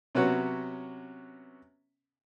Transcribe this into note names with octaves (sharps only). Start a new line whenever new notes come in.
C3 F#3 B3 C#4 F#4 B4